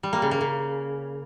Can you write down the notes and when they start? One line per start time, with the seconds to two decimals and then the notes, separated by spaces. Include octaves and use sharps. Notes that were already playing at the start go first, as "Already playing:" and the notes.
0.03 G3
0.13 A#3
0.22 C#3
0.31 A#3
0.41 C#3